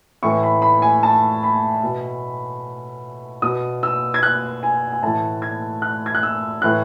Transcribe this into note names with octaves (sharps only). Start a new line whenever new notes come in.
A2 E3 C#6
B5
B5
G#5
A5
B5
B2
B2 D#6
E6
G#6
F#6
G#5
G#5
A2 E3 A5
G#6
F#6
G#6
F#6
E6
A2 E3 F#6